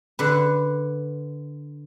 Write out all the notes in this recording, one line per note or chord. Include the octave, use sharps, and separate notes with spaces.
D3 B4